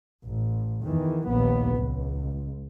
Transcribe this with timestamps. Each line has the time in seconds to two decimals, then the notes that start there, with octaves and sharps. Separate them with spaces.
0.24 A1
0.84 E2 D#3 E3
1.29 A#1 D#2 B3
1.74 C#2